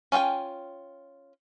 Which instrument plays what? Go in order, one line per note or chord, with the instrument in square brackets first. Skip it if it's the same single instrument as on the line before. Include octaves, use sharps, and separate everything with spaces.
[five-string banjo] C#4 F4 G#4 G5 G#5